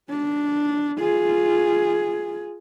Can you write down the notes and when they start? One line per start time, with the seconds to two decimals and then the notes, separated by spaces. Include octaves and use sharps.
0.10 D4
1.00 F4 G#4